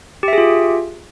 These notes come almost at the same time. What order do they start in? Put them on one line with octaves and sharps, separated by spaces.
G4 E5 G#4 F4